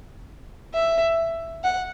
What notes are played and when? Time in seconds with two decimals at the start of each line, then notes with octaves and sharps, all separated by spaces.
0.74 E5
1.63 F#5